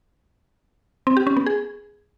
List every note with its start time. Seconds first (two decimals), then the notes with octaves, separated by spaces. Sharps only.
1.07 C4
1.17 G4
1.27 C#4
1.37 B3
1.46 G#4